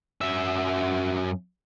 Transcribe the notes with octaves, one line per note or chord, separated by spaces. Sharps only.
F#2 E5